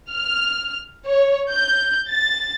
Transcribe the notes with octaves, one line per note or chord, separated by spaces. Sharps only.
F6
C#5
G6
A6